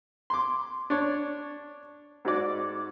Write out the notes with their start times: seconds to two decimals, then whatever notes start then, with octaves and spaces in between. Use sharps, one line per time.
0.30 C6 D6
0.90 D4 C#5
2.25 G#2 F#4 D5